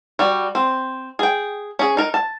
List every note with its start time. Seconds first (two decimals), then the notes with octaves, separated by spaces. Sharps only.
0.19 G3 F#4
0.55 C4
1.19 G#4 G5
1.79 C#4 G#4
1.97 D#4 A#4
2.14 A5